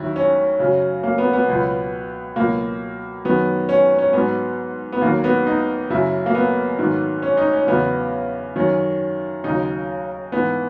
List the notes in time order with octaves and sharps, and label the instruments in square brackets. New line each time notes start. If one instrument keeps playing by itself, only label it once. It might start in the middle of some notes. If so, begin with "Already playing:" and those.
Already playing: [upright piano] D#2 D#3 F#3 E4
C#4
F#2 C#3 F#3
A#3
B3
B3
C#2 B2 F#3
C#2 B2 F#3 A#3
F#2 D#3 F#3 B3
C#4
C#4
G#2 F#3 B3
B3
D#2 D#3 F#3 A#3
B3
D#4
F#2 C#3 F#3 E4
A#3
B3
G#2 D#3 F#3
C#4
D#4
C#4
E2 C#3 F#3 B3
F#2 D#3 F#3 C#4
D#2 C#3 F#3 D#4
G#2 E3 B3